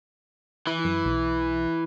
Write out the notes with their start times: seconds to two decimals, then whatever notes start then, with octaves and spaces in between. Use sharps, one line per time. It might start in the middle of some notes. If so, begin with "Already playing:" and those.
0.67 E3 E4
0.84 F#2
1.05 B1